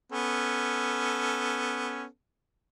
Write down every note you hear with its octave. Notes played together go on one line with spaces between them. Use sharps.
B3 C#4 A4